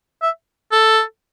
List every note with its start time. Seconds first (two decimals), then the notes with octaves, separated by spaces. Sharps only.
0.22 E5
0.72 A4